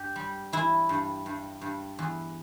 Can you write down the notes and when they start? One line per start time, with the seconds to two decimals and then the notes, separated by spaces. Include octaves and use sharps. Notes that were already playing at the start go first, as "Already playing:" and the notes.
Already playing: G2 G4
0.16 G3
0.53 E3 E4
0.89 G2
1.26 G2
1.61 G2
1.99 E2